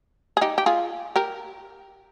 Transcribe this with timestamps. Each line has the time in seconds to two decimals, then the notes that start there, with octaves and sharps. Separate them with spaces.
0.37 G#4
0.41 D#4 G4
0.58 G4
0.66 F4 G#4
1.16 G4 A#4